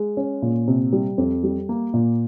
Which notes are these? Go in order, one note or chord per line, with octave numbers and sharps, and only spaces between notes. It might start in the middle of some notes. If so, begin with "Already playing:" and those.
Already playing: G#3
C#4
A#2
C3
G3
F2
G3
A#3
A#2